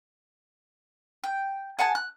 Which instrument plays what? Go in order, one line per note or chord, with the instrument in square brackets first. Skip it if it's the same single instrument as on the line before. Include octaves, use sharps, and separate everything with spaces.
[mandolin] G5
G#4 F#5 G#5 A5
F#6